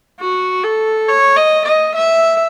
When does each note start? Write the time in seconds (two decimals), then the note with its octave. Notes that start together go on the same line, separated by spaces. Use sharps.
0.20 F#4
0.64 A4
1.08 C#5
1.36 D#5
1.66 D#5
1.95 E5